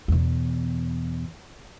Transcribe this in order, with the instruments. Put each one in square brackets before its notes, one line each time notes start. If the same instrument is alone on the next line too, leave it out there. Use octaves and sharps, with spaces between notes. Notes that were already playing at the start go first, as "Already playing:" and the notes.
[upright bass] E2 B2